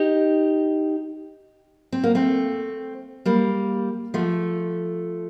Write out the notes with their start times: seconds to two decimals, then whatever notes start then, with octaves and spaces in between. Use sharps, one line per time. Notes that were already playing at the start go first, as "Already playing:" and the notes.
Already playing: D#4 G4
1.92 C4
2.04 A#3
2.15 A3 C4
3.25 G3 A#3
4.14 F3 A3